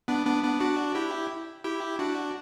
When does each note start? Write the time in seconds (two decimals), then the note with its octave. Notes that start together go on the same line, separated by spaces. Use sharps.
0.08 B3 D4
0.26 B3 D4
0.43 B3 D4
0.60 D4 F#4
0.95 E4 G4
1.64 E4 G4
1.99 D4 F#4